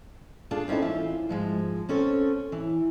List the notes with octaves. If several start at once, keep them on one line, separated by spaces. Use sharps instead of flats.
D4 F4 G#4 A4
C4 C#4 D#4 E4 A4
E3 F4 E5
G#2 F3 G#3
C4 C#4 A4 C#5
E3